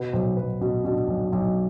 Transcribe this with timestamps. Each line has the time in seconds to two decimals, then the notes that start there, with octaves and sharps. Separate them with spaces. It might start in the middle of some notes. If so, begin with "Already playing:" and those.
Already playing: B2 B4
0.13 B1 C5
0.36 B1 B4
0.61 B2
0.85 B2 D4
1.08 B1
1.32 B1